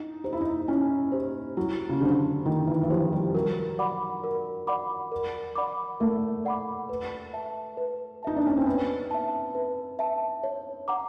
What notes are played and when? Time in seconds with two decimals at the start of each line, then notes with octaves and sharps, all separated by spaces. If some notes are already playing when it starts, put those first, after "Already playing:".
Already playing: D#4 E4
0.24 D#4 G4 C5
0.33 E4
0.41 D#4
0.68 C#4 E4
1.12 G4 C5
1.57 F#3 E4
1.89 C#3
2.01 D3 G4 C5
2.46 D#3 E4
2.67 E3
2.83 E3
2.90 F3 G4 C5
3.13 G3
3.35 F#3 A#4
3.79 D5 F#5 B5 D6
4.24 A#4
4.67 D5 F#5 B5 D6
5.12 A#4
5.56 D5 F#5 B5 D6
6.00 A3 A#4
6.45 D5 F#5 B5 D6
6.89 B4
7.34 E5 A5
7.77 B4
8.23 D#4 E5 A5
8.36 D4
8.47 C#4
8.57 C4
8.66 B3 B4
9.11 E5 A5
9.55 B4
9.99 E5 A5
10.44 C#5
10.88 F#5 A#5 D6